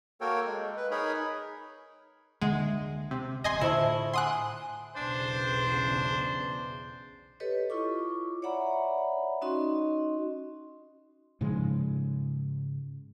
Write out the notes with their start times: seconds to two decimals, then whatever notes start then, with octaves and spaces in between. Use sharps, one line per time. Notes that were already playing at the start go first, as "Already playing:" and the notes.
0.21 A#3 F#4 A4 A#4 C#5 G5
0.46 G#3
0.77 B4
0.91 D#4 G#4 A#4 C#5 B5
2.41 D2 D3 G#3 A#3 E5 F#5
3.11 C3
3.44 E1 C3 D#5 G#5 C6
3.61 A2 D3 G#3 A3 E4 F4 C5 E5
4.14 F#5 G#5 C6 D#6 F#6
4.96 B1 E2 C#3 D4 C5
7.40 G4 A4 B4 C#5 D#5
7.70 E4 F4 C#6 D6
8.42 C#5 D5 E5 F#5 A#5 B5
9.42 C#4 D#4 F#4 D#5 C6
11.41 G#2 C#3 F3 G#3